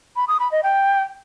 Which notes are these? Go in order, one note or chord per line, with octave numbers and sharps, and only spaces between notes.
B5
D#6
B5
D#5
G5